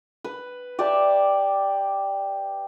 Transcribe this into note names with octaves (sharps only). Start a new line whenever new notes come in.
B4
G4 D5 E5 A5